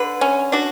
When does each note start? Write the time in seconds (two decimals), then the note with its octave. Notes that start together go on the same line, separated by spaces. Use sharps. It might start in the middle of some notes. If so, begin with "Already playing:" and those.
Already playing: D3 B4
0.21 C#4
0.52 D4 F#4